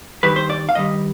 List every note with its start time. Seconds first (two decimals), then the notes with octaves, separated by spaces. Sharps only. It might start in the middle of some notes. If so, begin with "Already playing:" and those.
0.23 G2 D#3 G3 B4
0.36 C5
0.50 D5
0.69 F5
0.75 G2 D#3 G3 D#5